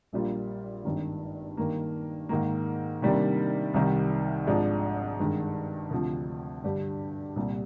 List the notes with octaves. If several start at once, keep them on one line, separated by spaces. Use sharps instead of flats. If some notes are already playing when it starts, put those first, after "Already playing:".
A#1 A#2 G3 A#3 F4
G#1 G2 D#3
G2 D#3 A#3
G#2 D#3 A#3
C3 D#3 G3 A#3 D4
C2 C3 D#3 G3
G#1 G#2 F3 G#3 D4
G2 D#3 G#3
D2 C3 F3
G2 D3 G3 D4 G4
C2 A#2 G3